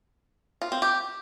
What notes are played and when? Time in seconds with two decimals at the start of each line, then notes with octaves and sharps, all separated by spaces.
0.62 F4
0.72 C4
0.82 G4